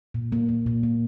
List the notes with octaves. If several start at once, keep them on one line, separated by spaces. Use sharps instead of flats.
A#2
A#3
A#3
A#2
A#3